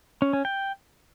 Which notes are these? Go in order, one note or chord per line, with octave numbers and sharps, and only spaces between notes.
C#4
C#4
G5